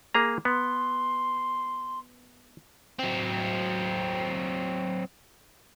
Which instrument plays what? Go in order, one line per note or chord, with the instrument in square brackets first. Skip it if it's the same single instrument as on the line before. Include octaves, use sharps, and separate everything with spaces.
[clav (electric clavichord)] A#3 G#4 A#5
[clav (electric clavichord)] B3 [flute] C6
[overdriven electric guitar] F#3 C4